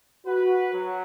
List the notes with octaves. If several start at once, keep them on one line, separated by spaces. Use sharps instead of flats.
F#4 B4
F#3